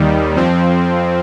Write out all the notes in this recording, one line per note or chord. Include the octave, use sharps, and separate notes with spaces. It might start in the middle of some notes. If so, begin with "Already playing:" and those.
Already playing: D#2 D#3 G3
F2 F3 C4